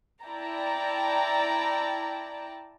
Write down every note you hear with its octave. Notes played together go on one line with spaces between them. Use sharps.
E4 D5 G5 A5 A#5